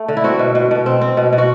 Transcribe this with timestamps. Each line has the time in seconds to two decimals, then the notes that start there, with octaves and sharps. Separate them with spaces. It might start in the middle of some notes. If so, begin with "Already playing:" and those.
Already playing: A3
0.08 D3
0.17 E4
0.24 C4 F#4
0.39 B2
0.55 B2
0.71 B2
0.86 C4
1.01 C4
1.17 B2
1.33 B2
1.38 F#4